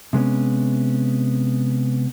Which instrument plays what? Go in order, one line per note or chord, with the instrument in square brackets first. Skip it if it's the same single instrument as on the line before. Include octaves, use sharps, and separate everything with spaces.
[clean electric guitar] C3 G#3 B3 C#4